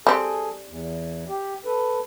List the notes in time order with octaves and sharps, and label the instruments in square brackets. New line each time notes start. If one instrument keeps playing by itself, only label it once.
[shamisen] G3 C4 [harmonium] G#4 A4
[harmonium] E2
G4
A4 B4